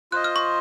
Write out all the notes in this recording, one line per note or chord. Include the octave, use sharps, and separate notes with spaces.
F4 C5 D#5 F#6
F6
C#6